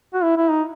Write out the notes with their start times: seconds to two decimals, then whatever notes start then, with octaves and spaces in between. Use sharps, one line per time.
0.14 F#4
0.23 E4
0.37 E4
0.51 D#4